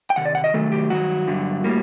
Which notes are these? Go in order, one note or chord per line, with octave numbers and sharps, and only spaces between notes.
G5
C3 D#3 F#5
D5
F#5
D#5
C3 D#3 F#3 A3 A4
G4
G2 D#3 F#3 F#4
G2 D3 F#3
A2 G3 A#3